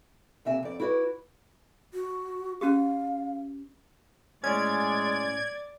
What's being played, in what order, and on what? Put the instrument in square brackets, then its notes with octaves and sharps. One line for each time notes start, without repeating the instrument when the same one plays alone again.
[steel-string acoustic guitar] D#2 C3 E5 G#5
F2 D5
E4 F#4 B4 C#5 D5
[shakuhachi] F#4
[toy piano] C#4 F#4 G4 [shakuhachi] F5
[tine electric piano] A2 C#4 [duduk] G#3 [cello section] D5 [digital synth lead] G#6